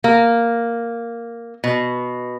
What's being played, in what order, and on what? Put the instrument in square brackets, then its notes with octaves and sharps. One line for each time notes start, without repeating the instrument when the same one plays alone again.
[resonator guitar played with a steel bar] A#3
B2